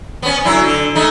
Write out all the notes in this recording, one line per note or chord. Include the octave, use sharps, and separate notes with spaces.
B3 C#4
D3 F#3 E4
D3
G#3 A3 D#4